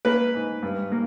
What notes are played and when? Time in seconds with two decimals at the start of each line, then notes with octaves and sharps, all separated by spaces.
0.05 A#3 B4
0.34 G#2
0.62 G2
0.92 A#3